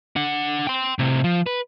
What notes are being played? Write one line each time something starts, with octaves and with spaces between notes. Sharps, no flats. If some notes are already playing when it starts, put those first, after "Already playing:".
D4 F#5
G5 C6
A2 C3
F3
B4